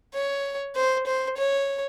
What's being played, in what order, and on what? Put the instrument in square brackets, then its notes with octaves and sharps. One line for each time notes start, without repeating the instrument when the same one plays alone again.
[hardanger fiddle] C#5
C5
C5
C#5